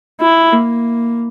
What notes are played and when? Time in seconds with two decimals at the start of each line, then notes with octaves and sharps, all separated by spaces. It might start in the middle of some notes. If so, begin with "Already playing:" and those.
0.21 E4
0.53 A#3